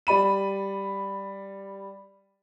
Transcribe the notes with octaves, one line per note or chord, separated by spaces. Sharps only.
G3 D5 B5 D#7